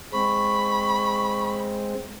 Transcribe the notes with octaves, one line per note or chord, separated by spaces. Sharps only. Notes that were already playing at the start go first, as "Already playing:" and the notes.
G#3 C4 B5 C#6